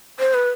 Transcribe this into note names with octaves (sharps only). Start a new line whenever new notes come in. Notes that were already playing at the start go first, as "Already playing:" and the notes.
C5
B4